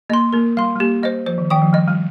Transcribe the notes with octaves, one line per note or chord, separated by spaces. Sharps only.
A#3 D#5 C6
A#3 A#4
G3 F5 C6
G3
A#3 G4
G3 C5 D#5
F3 C5
D#3
D#3 G5 D#6
F3
G3 D#5
G3